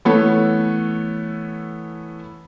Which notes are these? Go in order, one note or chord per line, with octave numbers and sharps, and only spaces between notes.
E3 A3 B3 A4 C#5